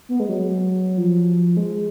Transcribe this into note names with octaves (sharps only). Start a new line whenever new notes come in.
B3
G#3
F#3
F3
G#3